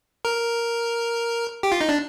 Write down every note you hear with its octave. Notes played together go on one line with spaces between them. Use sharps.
A#4
G4
F4
D#4
D4